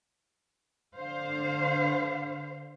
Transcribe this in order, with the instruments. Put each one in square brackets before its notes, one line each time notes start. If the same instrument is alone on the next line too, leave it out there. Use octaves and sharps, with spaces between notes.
[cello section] D3 C5 F5